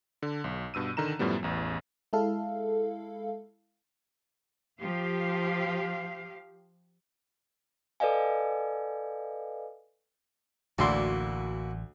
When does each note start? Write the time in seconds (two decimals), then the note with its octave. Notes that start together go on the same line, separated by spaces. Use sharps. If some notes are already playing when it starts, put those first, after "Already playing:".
0.22 D3
0.44 B1
0.74 G2 B2 E6 D#7
0.97 D3 D#3 A#5 E7
1.19 F#2 A2 F3 G3 B3
1.43 A1 E2
2.13 G#3 E4 A4 F5
4.80 F3 G4 F5
8.00 A4 B4 D5 D#5 F5 G#5
10.78 A1 D2 A#3 E4 F#4 D5 C6